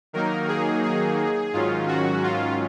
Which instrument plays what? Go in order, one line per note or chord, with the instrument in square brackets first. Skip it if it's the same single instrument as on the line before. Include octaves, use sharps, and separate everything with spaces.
[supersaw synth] D#3 F#3 A#3 D#4 A#4
G#4
G#4
G#2 D#3 F#3 C#4 F4
F#4
F4